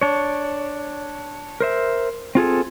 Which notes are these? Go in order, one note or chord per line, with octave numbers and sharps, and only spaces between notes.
D4 C#5
A#4 C5 E5
C4 F4 G#4 A4